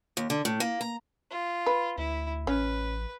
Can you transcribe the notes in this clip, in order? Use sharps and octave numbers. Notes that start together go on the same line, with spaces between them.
D#2
D3
A2
A#3
A#5
F4
B4
D2 E4
A1 C#4 B4